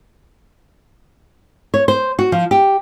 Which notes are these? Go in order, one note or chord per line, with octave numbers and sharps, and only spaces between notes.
C#5
C5
F#4
F3
G4